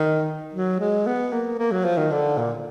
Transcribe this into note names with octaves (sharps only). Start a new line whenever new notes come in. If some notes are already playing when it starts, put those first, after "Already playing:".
Already playing: D#3
F#3
G#3
B3
A#3
A#3
F#3
F3
D#3
D3
A#2